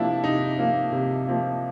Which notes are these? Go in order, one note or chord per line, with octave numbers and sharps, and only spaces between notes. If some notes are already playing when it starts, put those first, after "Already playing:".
Already playing: C3 F3 A#3 D4 E4
C3 D#4
F3 A#3
C3
F3 A#3